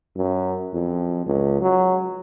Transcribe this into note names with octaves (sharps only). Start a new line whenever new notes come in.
F#2
F2
C#2
F#3